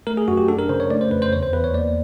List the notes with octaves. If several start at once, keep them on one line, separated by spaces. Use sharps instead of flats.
A3 A#4
G#4
F#2 F#4
G4
D4 A4
A#4
C#3 C5
C#5
A3 D5
C5
F2 B4
C5
E2 C#5
C5
E2 B4
C#5
A#3 D5